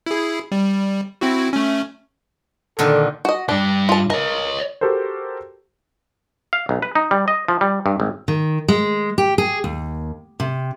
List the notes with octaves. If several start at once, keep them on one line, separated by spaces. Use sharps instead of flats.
E4 G#4
G3
C4 E4 F#4
A3 C#4
A#2 D3 D#3 A4
F#4 D#5
G2 D4 G4
F4 A5
A#4 C#5 D#5
F#4 G4 A4 A#4 C5
F5
B1
B4
D#4
G3
D#5
F3
G3
G2
G#1
D#3
G#3
G4
G#4
D#2
C3